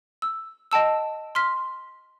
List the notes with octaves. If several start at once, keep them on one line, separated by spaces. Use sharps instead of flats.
E6
D#5 G5 A5 E6
C6 F6 B6